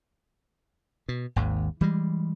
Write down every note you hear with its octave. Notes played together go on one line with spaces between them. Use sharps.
B2
G#1 D#2 G#2
E3 G3 G#3